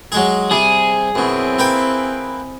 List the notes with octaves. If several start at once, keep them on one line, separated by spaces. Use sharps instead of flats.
F#3 G#3 G#4
C3 G3 G#4
F#2 B2 C4 E4
A#3 B4 G5